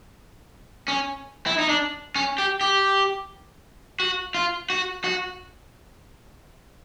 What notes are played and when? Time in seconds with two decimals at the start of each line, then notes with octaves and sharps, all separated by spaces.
0.88 C#4
1.46 E4
1.59 D#4
1.69 D4
2.16 C#4
2.38 G4
2.61 G4
4.00 F#4
4.34 F4
4.70 F#4
5.04 F#4